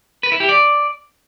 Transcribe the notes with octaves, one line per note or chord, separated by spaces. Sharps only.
B4
E4
G4
D5